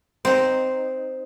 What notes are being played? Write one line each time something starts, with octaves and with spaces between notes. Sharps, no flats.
C4 D#4